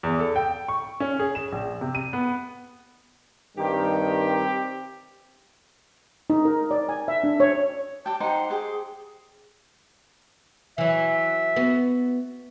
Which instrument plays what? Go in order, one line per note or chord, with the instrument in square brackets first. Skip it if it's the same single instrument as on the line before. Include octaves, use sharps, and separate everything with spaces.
[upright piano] E2
A4
G5
C#6
C#4
G#4
E7
A#1
C3
D#7
B3
[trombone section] G2 D#3 [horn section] C4 G4
[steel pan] D#4
A#4
D5
G#5
E5
D4
C#5
[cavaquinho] G4 G5 [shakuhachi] A5
[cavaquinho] D#4 C5 F#5 [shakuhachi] G5
[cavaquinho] G4 C5 [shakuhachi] G#4
[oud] E3 F#3 [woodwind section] E5
[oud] B3 F#4